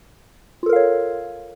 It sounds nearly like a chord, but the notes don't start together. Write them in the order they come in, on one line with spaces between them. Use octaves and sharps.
F4 A4 A#4 F5 C#5